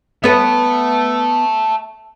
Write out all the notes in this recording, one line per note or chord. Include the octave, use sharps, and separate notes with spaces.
B3 B4 E5 A5